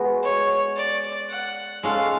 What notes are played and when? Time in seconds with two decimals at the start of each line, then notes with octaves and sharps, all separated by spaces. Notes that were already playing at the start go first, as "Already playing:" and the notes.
Already playing: G#3 B3 F#4
0.23 C#5
0.77 D5
1.30 F#5
1.83 G#3 C#4 F4 A4 F5